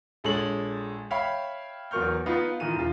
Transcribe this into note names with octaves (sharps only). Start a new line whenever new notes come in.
A#1 G#3 A4 C#5 F#7
C#5 E5 F5 G5 B5
E2 F#3 A#4 C#6 F6 G6
B3 D#4 F4 B4
A#2 D#3 E3 D#7
E1 F4